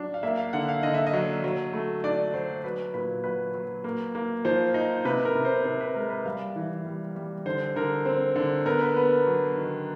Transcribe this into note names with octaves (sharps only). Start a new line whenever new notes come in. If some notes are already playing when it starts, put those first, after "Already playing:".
Already playing: F#3 D4
F5
A#3 E5
F5
D3 F#5
F5
D3 D#5
E5
D#5
F#3
F#3
A3
D4 D5
F#3 C5
F#3 B4
A#2 B4
F#3 B4
F#3
A#3
A#3
F3 C5
D#4
C3 B4
A#4
C3
C5
C3 C5
B4
G#3 A#4
B4
G3 F5
E3
G3
G3
D3 C5
D3 A#4
C4
D3
B3 A#4
B4
B3 B4
A#4
F#3
D#3